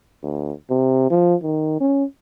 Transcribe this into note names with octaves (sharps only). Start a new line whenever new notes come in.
D2
C3
F3
D#3
C#4